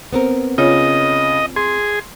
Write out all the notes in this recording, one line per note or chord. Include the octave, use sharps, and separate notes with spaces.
B3 C4 A#4
C#3 F4 C#5 D#5
G#4 C6